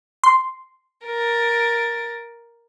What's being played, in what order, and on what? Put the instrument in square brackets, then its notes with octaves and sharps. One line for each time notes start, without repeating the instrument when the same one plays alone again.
[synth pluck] C6
[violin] A#4 A6